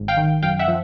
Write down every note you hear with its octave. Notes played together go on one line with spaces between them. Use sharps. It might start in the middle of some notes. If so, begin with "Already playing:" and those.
Already playing: G#1
F5 G5
D#3
F#2 F5 G5
E5 F#5
F3